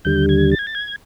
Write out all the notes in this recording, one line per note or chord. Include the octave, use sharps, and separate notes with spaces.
D#2 D3 G3 G6
G#6
A6
G#6
A6
G#6